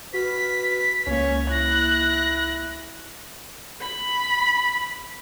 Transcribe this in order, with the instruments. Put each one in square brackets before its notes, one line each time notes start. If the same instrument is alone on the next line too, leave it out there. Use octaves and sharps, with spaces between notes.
[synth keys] F#4 F6 [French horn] B4 [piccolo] B6
[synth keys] C#2 A#3 [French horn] C#4 [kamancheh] C#5
[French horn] E4 [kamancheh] F#6 [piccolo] A#6
[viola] B5